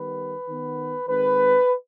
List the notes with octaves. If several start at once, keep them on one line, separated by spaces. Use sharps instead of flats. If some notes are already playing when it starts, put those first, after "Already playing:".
Already playing: D#3 G3 B3 B4
D#3 B3
D#3 G#3 C4 B4